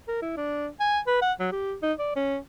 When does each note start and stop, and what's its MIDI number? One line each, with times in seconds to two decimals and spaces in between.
0.08 0.22 70
0.22 0.36 64
0.37 0.68 62
0.80 0.99 80
1.07 1.19 71
1.22 1.33 78
1.39 1.47 54
1.52 1.74 67
1.82 1.93 63
1.99 2.13 74
2.16 2.37 61